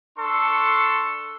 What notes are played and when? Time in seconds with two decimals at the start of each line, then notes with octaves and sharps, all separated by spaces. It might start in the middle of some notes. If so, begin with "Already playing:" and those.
0.19 D4 A4 C6 C#6